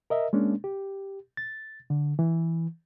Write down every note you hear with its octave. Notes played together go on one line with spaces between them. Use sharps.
A#4 D#5 E5
G#3 A#3 C#4 D4
G4
A6
D3
E3